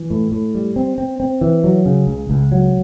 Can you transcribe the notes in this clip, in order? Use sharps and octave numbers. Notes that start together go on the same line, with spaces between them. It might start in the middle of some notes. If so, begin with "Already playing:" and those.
Already playing: E3
A2
A2
G3
C4
C4
C4
E3
F#3
C#3
C#2
C#2
F#3